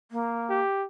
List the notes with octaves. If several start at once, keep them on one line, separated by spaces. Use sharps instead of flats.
A#3
G4